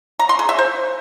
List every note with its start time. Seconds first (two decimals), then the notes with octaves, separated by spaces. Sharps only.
0.19 A#5
0.29 C6
0.39 G#4
0.49 E5
0.59 C5